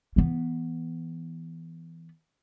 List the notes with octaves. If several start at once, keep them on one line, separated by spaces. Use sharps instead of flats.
E3 B3